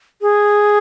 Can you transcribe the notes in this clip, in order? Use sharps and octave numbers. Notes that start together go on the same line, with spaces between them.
G#4